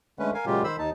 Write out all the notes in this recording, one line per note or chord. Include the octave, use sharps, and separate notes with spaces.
D3 G#3 A3 C#4 B4
A#4 F5 G#5
A#2 C#3 F#3 G#3 F4 G4
D#3 C5 B5 E6
D#2 D#4 A5